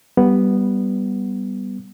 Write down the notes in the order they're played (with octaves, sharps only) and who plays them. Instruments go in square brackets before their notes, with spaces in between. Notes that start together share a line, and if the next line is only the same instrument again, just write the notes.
[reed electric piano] G3 B3